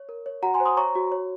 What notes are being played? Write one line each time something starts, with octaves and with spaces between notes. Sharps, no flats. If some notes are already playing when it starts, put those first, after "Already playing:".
Already playing: C#5
A#4
C#5
F#4 F#5 A#5
G#5 C6
C5
C6 D#6
C#5 A#5 C#6
F#4
C#5